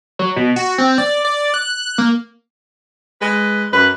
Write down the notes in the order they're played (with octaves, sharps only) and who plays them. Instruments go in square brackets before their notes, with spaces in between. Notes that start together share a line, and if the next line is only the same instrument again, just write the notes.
[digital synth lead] F#3
B2
F#4
C4
D5
D5
F#6
A#3
[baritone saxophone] G#3 [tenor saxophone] B4
[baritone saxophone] F#2 [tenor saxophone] B4